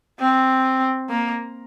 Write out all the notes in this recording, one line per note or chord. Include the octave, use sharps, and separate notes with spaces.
C4
A#3